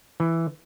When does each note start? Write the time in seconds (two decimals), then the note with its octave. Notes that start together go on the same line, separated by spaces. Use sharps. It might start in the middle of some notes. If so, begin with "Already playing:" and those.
0.20 E3